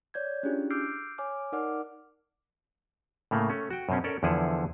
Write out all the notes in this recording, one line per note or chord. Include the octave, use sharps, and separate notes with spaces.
C#5 D5 G6 G#6
C#4 D4 E4 F4 G4 G#4
D6 E6 F6 G6 C7 D7
C#5 G#5 D6 F6
D#4 A#4 D5 F#5 D6 F6
A2 C#3 A3 A#3
A3 C#4
F#4 G5
F#2 B2 C4 C#4
C#4 A4 A#4 D5
E2 D3 F3 E4 G#4 F#5